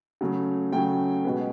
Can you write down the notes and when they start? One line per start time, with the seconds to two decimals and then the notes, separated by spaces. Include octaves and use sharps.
0.21 C#3 F#3 A3
0.72 C#3 F#3 A3 G5
1.25 B2 G#3 B3